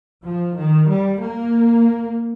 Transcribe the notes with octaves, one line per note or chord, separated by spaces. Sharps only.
F3
D#3
G3
A#3